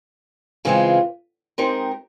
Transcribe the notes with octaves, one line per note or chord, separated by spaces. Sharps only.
C#3 E3 G#3 C4 F4
G#3 C4 D#4 G4 A#4